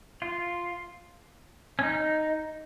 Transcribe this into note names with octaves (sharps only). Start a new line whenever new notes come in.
F4
C#4
D#4